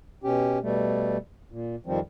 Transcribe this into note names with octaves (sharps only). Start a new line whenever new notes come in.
B2 C#4 G4
B2 G3 A3
A#2
F2 D#3 F3 G3 C4